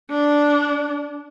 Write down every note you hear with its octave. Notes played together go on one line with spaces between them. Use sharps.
D4